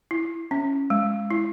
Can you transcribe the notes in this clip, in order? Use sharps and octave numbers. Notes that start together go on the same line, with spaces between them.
E4
C#4
G#3
E4